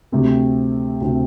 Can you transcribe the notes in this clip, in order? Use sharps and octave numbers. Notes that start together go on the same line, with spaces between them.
D2 C3 A3 C4
D2 C3 A3 C4